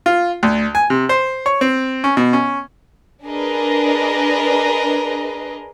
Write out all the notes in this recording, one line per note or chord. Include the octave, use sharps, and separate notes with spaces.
F4
D2
G#5
C3
C5
C#5
C4
C#4
B2
C#4
D4 G#4 A#4 B4 D#5